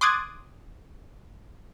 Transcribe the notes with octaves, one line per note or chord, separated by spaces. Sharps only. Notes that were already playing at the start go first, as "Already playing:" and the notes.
C6 D6 D#6 F#6 G#6 A6